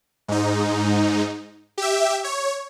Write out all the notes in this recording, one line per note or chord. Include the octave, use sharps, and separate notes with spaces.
G#2 D#4
G4 E5
C#5